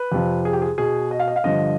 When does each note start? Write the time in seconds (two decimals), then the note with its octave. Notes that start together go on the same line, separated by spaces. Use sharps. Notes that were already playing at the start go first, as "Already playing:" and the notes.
Already playing: B4
0.12 F2 C3 F3
0.45 G#4
0.53 G4
0.62 G#4
0.78 B2 G#4
1.11 D#5
1.19 F5
1.28 D#5
1.36 F5
1.44 G2 D3 F3 D#5